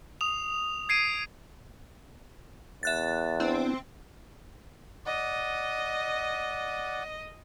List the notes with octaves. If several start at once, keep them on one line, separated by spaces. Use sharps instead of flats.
D#6 F7
G#6 C7 D7 D#7
E2 E5 F#6 A6
B3 C4 D4 E4
D5 D#5 F#5